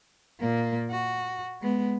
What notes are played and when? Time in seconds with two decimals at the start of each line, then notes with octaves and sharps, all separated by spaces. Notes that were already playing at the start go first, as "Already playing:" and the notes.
0.40 A#2 A#3
0.90 F#4
1.61 G#3 B3